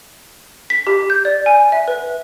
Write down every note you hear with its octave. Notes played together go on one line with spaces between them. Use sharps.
B6
G4
G6
D5
G#5
E5
B4